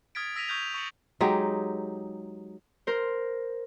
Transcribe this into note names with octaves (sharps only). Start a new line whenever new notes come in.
D#6 F6 G#6 A6 B6 D7
E6 A#6 B6 D#7 F7
C#6 D#6 F6 G6 G#6 F7
C#6 A6 C#7 F#7
F#3 G#3 D#4 G4
A#4 C5